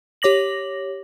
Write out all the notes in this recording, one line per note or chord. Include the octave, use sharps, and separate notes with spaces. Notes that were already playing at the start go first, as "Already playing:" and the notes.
G4 C#5 D6 A#6 F#7